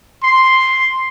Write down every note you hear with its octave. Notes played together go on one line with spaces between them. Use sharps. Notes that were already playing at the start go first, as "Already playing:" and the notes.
C6